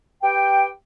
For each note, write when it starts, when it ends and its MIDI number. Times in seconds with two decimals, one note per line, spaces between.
0.22 0.67 67
0.22 0.67 71
0.22 0.67 79